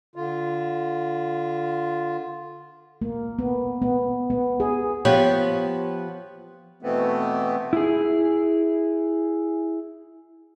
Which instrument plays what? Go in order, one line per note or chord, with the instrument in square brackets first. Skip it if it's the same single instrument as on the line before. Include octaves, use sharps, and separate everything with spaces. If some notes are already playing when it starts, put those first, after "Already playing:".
[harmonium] D3 F4
[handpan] A#3
B3
B3
B3
G#4
[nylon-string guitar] F3 B3 G4 C#5
[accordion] B2 E3 A3 B3 C4
[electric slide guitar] E4 G#4